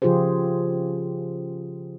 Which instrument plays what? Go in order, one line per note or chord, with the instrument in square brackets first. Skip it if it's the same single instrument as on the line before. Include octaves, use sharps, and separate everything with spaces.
[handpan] C#3 F3 F4 G4 G#4 C5